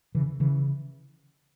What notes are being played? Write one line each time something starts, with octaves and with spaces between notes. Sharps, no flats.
C#3 E3
C#3 E3